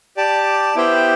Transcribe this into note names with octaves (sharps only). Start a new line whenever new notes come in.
G4 D5 A5
B3 E4 G4 C5 G5